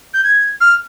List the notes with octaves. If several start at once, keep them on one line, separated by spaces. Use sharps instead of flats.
G6
G#6
F6